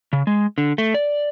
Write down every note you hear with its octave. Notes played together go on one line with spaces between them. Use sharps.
C#3
G#3
D3
A3
D5